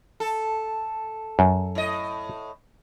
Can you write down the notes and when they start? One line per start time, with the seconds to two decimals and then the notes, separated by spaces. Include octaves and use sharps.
0.20 A4
1.39 F#2
1.75 A2 D#5